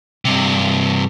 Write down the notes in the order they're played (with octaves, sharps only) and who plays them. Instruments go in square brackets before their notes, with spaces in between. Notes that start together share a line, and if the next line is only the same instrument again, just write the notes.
[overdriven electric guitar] G2 C3